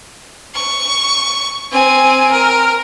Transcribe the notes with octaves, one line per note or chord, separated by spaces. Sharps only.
C#6
C4 G#5
A#4